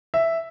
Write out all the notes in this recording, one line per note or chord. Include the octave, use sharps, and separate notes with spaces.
E5